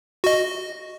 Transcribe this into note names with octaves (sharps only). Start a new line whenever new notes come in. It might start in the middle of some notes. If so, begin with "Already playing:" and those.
F#4 D#5